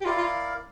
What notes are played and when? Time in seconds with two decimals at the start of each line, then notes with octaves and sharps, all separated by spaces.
0.01 G4
0.05 E4 F4 A#4 D5 F5
0.17 F4